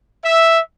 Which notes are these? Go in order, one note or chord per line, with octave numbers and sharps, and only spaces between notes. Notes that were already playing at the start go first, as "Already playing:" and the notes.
E5